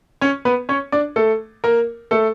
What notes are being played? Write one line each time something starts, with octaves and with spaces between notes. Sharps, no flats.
C#4 C#5
B3 B4
C#4 C#5
D4 D5
A3 A4
A#3 A#4
A3 A4